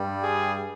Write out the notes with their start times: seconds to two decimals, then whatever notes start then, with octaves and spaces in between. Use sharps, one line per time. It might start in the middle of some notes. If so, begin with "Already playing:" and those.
Already playing: G2 G3
0.23 G#4